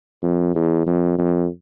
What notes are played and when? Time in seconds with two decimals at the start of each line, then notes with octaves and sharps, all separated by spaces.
0.23 F2
0.55 E2
0.86 F2
1.18 F2